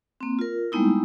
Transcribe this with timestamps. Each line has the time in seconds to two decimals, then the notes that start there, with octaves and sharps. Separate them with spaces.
0.21 A#3 C4
0.39 F4 A#4
0.72 G3 G#3 A#3 B3 D#4 E4